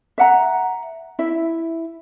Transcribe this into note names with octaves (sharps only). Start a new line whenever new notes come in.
E5 F#5 A#5
E4 E5